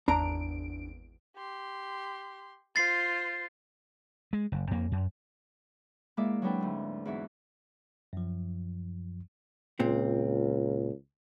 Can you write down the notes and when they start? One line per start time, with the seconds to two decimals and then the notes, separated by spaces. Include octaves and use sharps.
0.08 G#1 E2 D4 A#5 D7
1.36 G4 C6
2.76 F4 C5 A6 C7
4.33 G#3
4.52 F#1
4.71 F2 A#3
4.92 F#2
6.17 G#3 A#3 E4 D5 E5 D6
6.42 F#3 G#3 C4 D4 B4 G5
6.61 D2 G#2
7.05 E2 G#2 E4 F#4 E5
8.13 F#2 F3
9.80 C#2 A#2 C4